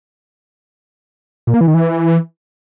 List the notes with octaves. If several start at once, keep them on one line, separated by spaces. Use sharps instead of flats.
A#2
A#3
E3
D#3
E3